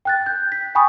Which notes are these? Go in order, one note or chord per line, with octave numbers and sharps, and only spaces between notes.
G5 F#6 A6
G6
B6
G5 G#5 B5 C#6 D#6